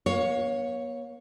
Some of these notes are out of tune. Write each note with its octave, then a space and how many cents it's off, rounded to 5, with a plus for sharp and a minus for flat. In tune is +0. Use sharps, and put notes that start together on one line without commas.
B3 -45 C#5 +0 F5 +25